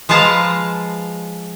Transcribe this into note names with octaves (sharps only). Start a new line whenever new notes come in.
F3 G#3 B4 F5 A5 A#5